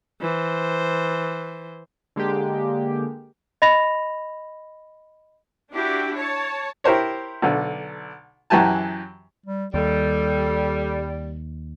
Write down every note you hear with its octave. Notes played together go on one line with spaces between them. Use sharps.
E3 C5
D3 G#3 A#3 G4
D#5 B5 A#6 F7
D4 E4 F#4 G4
C#5 A5
E4 G4 A#4 C5 C#5
B1 D3
F#2 E3 F#3 G4 G#5 A5
G3
D#2 G3 A4